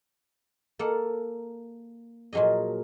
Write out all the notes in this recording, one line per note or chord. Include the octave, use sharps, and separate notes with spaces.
A#3 A4 F#5
A#2 F3 F#3 G#4 D#5